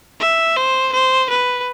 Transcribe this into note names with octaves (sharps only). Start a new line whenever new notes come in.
E5
C5
C5
B4